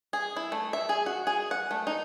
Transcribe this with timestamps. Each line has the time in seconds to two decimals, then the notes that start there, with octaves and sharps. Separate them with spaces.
0.13 G#4
0.37 E4
0.52 A3
0.73 E5
0.89 G#4
1.06 F#4
1.27 G#4
1.51 F#5
1.71 A3
1.87 D#4